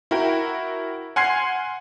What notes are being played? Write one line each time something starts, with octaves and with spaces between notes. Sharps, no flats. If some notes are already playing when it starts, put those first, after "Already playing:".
E4 F#4 A#4 G5
F#5 G#5 C6 F6 G#6 C7